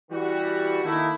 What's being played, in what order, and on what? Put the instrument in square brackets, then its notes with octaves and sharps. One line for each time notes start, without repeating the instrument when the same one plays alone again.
[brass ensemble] E3 G3 F#4
D#3 A3 A#3 E4